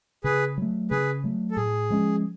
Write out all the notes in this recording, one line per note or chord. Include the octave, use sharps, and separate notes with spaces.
C#3 G#4 B4
F#3 A3
C#3 G#4 B4
F#3 A3
A4
A2 G#4
F3 G#3 C#4